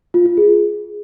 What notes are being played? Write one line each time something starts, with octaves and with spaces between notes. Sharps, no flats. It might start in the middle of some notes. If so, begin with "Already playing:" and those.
F4
F4
G#4